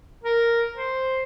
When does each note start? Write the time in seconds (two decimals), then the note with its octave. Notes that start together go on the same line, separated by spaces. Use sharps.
0.23 A#4
0.76 C5